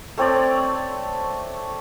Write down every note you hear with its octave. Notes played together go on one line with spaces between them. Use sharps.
A3 C4 C#5 D5